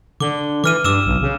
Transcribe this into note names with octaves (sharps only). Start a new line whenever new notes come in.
D3 D6 G7
E3 D6 F6 D#7
G2 D6 E6 E7
B1
C#3